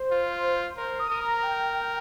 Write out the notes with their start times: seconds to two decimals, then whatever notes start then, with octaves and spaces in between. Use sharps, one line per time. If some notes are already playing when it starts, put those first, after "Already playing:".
Already playing: C5
0.11 F4
0.77 A#4 C5
0.99 D#6
1.10 A#4
1.21 A#5
1.43 G5